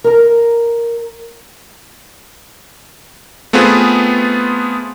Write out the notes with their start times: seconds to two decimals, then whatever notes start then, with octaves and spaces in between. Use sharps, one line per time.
0.04 A#4 A#5
3.53 A3 B3 C4 F4 G#4 B4